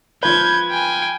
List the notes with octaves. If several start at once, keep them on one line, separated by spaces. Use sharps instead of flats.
F3 B4 G6 G#6
G5 G#5